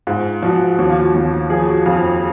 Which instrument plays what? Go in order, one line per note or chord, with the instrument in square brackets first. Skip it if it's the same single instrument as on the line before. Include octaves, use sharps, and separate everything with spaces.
[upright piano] G#2 F4
F3 F#4
D#2 F#4
F4
F#4
D#2 F#4
F3 G#4
F#4
F2 F4